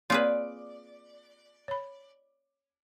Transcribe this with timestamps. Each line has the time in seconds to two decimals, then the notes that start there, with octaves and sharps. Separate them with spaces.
0.10 A#3 C4 F4 G#4 B4 C#5 D5
1.68 C#5 B5